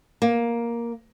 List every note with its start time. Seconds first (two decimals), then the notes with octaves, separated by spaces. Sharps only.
0.22 A#3